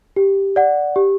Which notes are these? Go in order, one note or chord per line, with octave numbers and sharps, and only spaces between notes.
G4
D5 F#5
G4